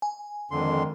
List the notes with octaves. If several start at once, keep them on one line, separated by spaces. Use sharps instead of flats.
G#5
F2 D3 D#3 G#3 C6